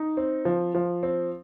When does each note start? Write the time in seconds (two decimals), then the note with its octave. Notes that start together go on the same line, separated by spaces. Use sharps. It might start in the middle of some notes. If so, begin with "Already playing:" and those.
Already playing: D#4
0.17 C4
0.45 F3
0.75 F3
1.03 C4